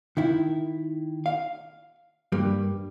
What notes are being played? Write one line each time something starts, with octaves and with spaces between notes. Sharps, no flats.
D#3 E4
F5
G2 G3 A#3